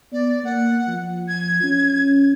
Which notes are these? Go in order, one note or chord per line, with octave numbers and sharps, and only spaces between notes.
B3 D5
A#3 F#5
F3
G#6
C#4